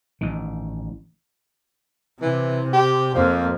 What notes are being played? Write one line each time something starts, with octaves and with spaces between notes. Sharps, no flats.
A1 D#3
C3 E3
G4
F2 F3 A#3